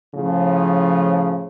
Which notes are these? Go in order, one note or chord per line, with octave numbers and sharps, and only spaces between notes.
A2 C#3 F3